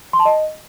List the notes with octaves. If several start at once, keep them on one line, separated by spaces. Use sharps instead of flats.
C6
A5
D#5